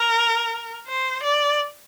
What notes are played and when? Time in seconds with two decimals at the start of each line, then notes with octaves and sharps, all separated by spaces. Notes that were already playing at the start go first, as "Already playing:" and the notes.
Already playing: A#4
0.87 C5
1.23 D5